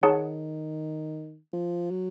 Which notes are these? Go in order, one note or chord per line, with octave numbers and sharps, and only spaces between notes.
D#3 D#4 G#4 C#5 F#5 A5
F3
F#3